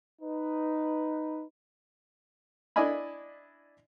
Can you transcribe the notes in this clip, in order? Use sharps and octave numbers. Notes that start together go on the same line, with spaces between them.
D#4 B4
D4 E4 D5 D#5 G#5 B5